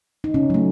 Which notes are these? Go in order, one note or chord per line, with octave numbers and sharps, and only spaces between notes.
D#4
C#3 C#4
F#3 A3